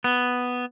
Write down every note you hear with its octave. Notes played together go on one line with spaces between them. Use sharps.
B3